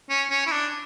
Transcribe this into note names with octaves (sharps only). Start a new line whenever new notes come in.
C#4
C#4
E4
D4